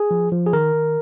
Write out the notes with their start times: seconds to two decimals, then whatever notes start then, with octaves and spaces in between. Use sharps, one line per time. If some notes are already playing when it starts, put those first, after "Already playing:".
Already playing: G#4
0.11 F3
0.32 F3
0.46 G#4
0.53 D#3 A#4
0.74 D#3